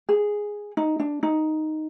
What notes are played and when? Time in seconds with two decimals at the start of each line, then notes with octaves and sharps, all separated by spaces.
0.09 G#4
0.77 D#4
1.00 D4
1.23 D#4